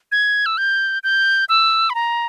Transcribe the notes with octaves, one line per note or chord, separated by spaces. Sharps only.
G#6
E6
G6
G6
E6
B5
A#5